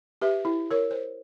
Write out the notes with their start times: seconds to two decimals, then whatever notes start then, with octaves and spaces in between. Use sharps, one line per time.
0.22 G4 B4 E5
0.45 E4
0.71 A#4 C#5
0.91 C5